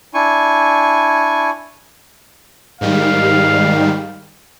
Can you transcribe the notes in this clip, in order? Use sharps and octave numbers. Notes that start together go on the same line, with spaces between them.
D4 E4 G#5 C#6
G#2 D#3 G3 F5